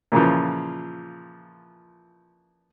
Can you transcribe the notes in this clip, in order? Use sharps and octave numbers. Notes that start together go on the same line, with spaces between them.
A#2 C#3 E3 F3